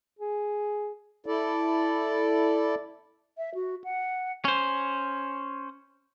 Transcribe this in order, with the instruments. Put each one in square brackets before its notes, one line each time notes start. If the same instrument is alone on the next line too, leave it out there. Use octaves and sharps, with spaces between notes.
[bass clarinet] G#4
[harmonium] E4 A4 D5
[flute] E5
F#4
F#5
[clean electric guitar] C#4 C5